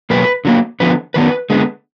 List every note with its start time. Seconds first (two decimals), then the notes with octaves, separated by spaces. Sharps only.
0.10 B2 F#3 A#3 B4
0.45 D3 F#3 A#3
0.80 D3 F3 B3 B4
1.14 D#3 F#3 B3 B4
1.50 D3 G#3 B3